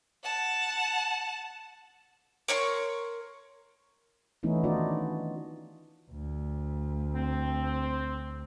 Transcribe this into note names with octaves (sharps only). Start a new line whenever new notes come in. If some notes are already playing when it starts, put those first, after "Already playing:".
F#5 A5
A#4 C#5 C6 C#6
E3 A3 B3 C#4 D#4 E4
D#3 D4 D#4 F4 F#4 D5
D2
C4